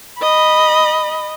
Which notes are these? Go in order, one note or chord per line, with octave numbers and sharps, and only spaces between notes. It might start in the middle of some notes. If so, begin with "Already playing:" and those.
D#5 B5